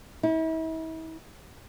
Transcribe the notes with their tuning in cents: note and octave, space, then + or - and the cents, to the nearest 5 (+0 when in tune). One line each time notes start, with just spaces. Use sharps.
E4 -40